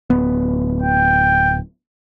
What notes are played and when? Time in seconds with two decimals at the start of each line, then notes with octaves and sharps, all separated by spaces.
0.10 D1 B3
0.82 G5